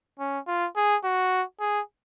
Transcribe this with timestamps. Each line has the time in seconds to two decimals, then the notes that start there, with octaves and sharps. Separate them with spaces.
0.19 C#4
0.47 F4
0.76 G#4
1.04 F#4
1.60 G#4